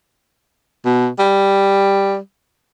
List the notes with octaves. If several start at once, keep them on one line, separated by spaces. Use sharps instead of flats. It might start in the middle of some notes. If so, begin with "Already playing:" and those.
B2
G3